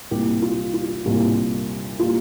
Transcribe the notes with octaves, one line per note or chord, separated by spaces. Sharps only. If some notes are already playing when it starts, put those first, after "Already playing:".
C2 A#2 G3 G4
F4
F4
C2 A#2 G3
A#2 G3 F4